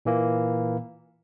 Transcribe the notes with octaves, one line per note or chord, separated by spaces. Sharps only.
A#2 E3 A#3